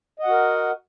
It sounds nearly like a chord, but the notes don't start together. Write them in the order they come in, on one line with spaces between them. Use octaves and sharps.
D#5 F#5 F#4 A#4